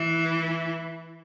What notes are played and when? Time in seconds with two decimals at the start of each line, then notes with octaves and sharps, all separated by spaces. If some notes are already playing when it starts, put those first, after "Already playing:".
Already playing: E3